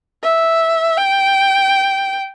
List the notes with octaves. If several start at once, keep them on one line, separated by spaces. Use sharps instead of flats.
E5
G5